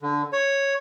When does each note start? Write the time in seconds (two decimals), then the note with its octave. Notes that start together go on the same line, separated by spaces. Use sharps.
0.02 D3
0.33 C#5